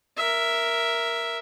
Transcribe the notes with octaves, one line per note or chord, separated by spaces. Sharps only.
A#4 E5